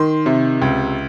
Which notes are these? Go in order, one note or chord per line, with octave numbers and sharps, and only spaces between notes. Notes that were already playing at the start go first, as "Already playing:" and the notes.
Already playing: D#3 C6
C3
C#2